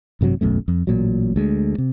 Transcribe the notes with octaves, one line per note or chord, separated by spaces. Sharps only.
A1 G2 C3 F#3
E1 B1 F#2 A3
F2
A1 A#2 F#3
D2 G#3
C3